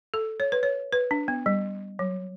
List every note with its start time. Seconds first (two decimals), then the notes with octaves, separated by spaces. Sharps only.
0.14 A4
0.40 C#5
0.52 B4
0.63 C#5
0.93 B4
1.11 D4
1.28 B3
1.46 G3
1.99 F#3